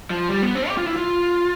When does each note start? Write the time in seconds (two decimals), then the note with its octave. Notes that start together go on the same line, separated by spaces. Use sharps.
0.10 F3
0.29 G3
0.42 B3
0.55 C4
0.68 G4
0.77 F4
0.87 E4
0.96 F4